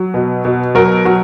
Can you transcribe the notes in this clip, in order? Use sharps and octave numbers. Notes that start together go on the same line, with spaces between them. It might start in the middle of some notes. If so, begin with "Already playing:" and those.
Already playing: F#3
B2
B2
F#3 A#4
F#3